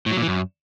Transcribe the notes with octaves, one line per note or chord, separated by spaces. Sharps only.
A2
F#3
A#2
E3
F#2